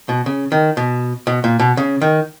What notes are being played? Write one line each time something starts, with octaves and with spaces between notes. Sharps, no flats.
B2
C#3
D#3
B2
B2
A#2
B2
C#3
D#3